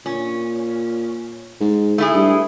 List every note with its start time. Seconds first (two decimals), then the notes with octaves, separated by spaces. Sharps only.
0.06 A#2 C#4
1.61 G#2
1.98 A3 E4 G#4
2.15 G2